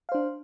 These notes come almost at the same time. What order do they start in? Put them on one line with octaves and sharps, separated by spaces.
F5 C5 D4